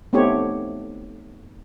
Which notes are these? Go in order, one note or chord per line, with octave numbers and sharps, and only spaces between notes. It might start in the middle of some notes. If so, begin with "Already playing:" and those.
A3 B3 C4 D#4 G4 C#5